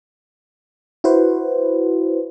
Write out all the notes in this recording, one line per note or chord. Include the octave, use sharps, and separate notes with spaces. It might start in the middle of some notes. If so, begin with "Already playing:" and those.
E4 F#4 B4 C5